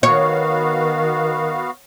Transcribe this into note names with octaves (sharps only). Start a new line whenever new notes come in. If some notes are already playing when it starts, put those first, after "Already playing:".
D#3 B3 F#4 C#5 F5